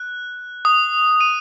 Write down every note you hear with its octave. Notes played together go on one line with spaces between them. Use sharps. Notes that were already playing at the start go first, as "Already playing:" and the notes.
Already playing: F#6
D#6
D#7